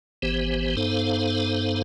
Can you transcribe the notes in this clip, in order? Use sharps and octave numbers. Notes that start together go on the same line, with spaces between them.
G#1 E3 B3 G4 C5
G2 B3 D#4 A4 C5 F5